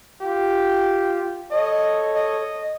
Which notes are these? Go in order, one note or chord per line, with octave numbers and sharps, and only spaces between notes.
F4 G4
A4 C#5 D#5
D#5